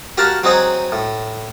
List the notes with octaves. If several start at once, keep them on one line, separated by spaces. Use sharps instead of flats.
F#4 G4 A#4 F5 F#5 A5
F#3 C4 D#4 G#4 C#5 F#5
A2